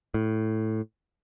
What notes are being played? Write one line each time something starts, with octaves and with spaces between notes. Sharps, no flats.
A2